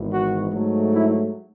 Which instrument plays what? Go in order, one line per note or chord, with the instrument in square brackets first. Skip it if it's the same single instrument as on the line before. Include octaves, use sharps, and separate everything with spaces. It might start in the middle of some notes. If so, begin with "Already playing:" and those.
Already playing: [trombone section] G#1 G#2 E3 B3
F#4
G#2 F#3 A3
E4